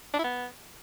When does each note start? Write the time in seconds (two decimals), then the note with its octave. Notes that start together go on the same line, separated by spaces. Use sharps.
0.14 D4
0.19 E4
0.24 B3